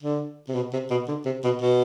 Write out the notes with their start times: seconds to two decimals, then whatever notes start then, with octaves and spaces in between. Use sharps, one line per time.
0.03 D3
0.48 C3
0.55 B2
0.73 C3
0.90 B2
1.08 D3
1.25 C3
1.44 B2
1.61 B2